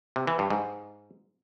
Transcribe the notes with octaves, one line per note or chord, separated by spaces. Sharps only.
C3
E3
G2
G#2